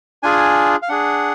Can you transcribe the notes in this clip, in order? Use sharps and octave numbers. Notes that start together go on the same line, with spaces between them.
D4 F4 G#4 G#5
F5
D4 G#4 F#5